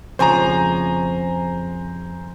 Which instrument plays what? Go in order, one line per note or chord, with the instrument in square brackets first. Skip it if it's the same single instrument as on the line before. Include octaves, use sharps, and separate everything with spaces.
[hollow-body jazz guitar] F2 C#3 F3 [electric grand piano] C5 G#5 A#5